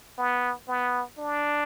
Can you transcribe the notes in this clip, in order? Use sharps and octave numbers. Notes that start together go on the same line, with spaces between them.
B3
B3
D4